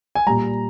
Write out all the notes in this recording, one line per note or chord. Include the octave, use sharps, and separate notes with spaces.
G#5
A#2 G3 A#5